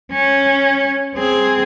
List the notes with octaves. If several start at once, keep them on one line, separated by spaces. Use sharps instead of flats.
C#4
C4 G#4